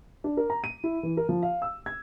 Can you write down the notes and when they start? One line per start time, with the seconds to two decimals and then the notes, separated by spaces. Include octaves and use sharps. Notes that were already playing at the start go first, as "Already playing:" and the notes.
0.24 D4
0.37 A#4
0.50 A#5
0.64 D#7
0.84 E4
1.03 E3
1.17 A#4
1.29 F3
1.43 F5
1.62 E6
1.86 G#6